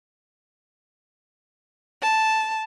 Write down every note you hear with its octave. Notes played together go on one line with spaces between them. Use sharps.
A5